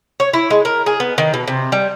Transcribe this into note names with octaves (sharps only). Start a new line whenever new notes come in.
C#5
E4
G#3
A#4
G#4
B3
D#3
B2
C3
G3